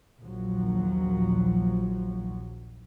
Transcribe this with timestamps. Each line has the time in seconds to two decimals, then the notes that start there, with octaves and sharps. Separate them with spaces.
0.20 A#1 D#2 F3 F#3